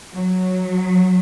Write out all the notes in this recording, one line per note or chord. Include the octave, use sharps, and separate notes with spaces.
F#3